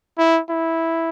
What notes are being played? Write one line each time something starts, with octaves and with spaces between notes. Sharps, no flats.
E4
E4